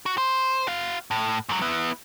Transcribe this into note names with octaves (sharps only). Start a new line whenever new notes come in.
F#4
C5
F#4 F5
A2
G#2 F#3
B3 E4